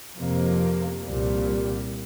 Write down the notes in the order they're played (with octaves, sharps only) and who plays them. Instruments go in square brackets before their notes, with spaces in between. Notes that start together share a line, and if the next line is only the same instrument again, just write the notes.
[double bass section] F2 C3 F3 A#3
C2 A#2 G3